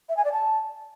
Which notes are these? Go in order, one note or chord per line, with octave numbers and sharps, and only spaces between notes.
E5
G#5
D5
A5